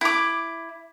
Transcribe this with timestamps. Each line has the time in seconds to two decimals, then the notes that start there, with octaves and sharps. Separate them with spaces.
0.01 E4 D6